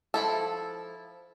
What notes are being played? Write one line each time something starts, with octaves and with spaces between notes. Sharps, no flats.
F3 E4 A4